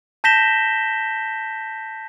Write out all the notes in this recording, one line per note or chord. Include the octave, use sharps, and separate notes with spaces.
A5 G6 A#6 B6 E7 G7